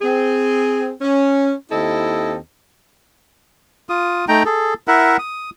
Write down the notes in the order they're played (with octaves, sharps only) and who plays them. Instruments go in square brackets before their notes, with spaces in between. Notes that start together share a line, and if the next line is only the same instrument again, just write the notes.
[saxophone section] C4 G#4
C#4
D#2 C4 E4 A4 D#5
[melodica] F4 D#6
A3 D#4 G5 A#5
G#4 A4
E4 A#4 E5 F#5
D#6